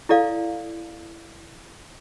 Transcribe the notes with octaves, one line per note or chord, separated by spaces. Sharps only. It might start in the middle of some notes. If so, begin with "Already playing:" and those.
E4 A4 D5 F5